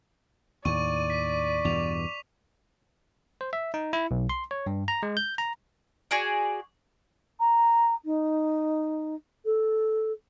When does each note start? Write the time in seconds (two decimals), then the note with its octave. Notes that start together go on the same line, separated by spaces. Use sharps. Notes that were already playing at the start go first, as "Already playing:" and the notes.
0.65 D#2 A2 D5 C#6 D#7
1.10 B6
1.65 E2 G2 B2 D6 F7
3.41 C5
3.53 E5
3.74 D#4
3.93 E4
4.11 B1
4.29 C6
4.51 C#5
4.66 G2
4.88 A#5
5.03 G#3
5.17 G6
5.38 A#5
6.11 F#4 G#4 D5
7.40 A#5
8.05 D#4
9.45 A4